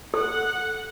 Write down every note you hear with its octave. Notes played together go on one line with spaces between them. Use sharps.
A4 F#5